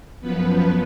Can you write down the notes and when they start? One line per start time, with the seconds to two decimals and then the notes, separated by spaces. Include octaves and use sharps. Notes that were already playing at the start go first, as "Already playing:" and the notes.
0.21 F#2 F3 B3 B4